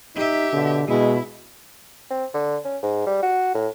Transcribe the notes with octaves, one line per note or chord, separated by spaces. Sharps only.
D#4 G4 E5
B2 D3
B2 G#3 E4
C4
D3
C#4
G#2
G3
F#4
A2